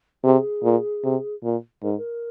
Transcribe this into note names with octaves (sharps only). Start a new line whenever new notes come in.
C3 G#4
A#2
C3
A#2
G#2 A#4
A#4